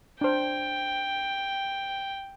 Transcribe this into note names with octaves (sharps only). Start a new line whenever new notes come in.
D4 C5 G5